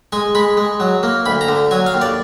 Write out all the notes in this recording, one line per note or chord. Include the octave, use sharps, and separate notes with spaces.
G#3 G#5
G#3 B5
G#3
F#3
A#3
D2 B5
A#5
D3
F#3 G#5
F5
D#2
D5